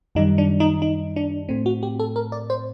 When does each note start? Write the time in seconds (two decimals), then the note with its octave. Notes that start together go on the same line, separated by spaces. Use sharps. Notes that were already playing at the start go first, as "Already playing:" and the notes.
0.15 F#2 D#3 G3 D#4
0.38 D4
0.60 D#4
0.82 D#4
1.16 D4
1.49 A2 A3 C4
1.66 F#4
1.83 G4
1.99 A4
2.16 A#4
2.32 D5
2.50 C5